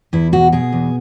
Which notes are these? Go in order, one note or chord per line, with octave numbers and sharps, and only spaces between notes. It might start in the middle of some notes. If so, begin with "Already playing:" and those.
E2 E4
B2 F#4
B2 G#4
E2